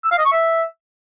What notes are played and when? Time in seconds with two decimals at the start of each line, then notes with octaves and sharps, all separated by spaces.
0.04 E6
0.11 F5
0.18 D#5
0.25 C#6
0.32 E5